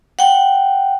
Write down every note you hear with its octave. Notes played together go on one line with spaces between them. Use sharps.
F#5 G5